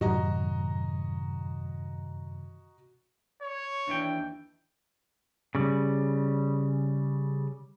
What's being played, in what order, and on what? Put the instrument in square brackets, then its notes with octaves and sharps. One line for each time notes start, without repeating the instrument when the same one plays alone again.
[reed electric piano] F#2 [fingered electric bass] A2 C3 D#3 [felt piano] F#4 D#5 A#5
[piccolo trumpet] C#5
[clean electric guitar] D#2 E3 G5 [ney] D4
[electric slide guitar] C#3 G3